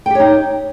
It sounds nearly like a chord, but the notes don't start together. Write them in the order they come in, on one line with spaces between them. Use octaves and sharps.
G5 G4 C#5 D#4